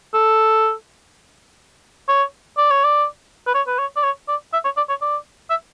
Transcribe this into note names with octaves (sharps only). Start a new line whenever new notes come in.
A4
C#5
D5
C#5
D5
B4
C#5
B4
C#5
D5
C#5
D5
E5
C#5
D5
C#5
D5
E5